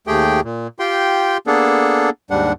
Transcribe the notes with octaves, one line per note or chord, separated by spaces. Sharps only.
D#2 A3 G4 G#4 G5
A#2
F4 G4 G5 C6
A#3 B3 D4 G#4 A4
D#2 G#2 G3 D4 F#5